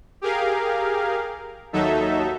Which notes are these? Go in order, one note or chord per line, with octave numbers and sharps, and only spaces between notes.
G4 G#4 A#4 F5
D#2 F#3 D#4 A4 E5